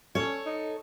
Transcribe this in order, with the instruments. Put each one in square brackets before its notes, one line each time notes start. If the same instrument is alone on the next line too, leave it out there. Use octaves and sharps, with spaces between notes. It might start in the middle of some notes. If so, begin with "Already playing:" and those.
[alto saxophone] C#4 [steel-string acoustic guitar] A4 C#5
[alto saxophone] D#4